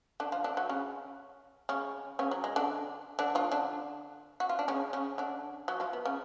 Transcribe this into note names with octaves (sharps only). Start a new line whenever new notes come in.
D3 D4
F3 F4
D3 D4
F#3 F#4
C#3 C#4
C#3 C#4
C#3 C#4
F#3
G#3
D3 D4
D3 D4
F3 F4
D3 D4
F#4
F4
D4
C#3 C#4
C#3 C#4
D3 D4
F#3 F#4
F3 F4
B3
C#3 C#4